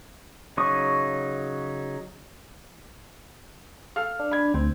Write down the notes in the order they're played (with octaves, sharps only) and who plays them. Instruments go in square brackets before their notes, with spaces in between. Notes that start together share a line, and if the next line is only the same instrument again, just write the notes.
[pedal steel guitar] C#3 F#3 D#4 C#6 D#6
[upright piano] A4 F5 F6
[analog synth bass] D4
[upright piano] B5 G#6
[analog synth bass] D2 [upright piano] C4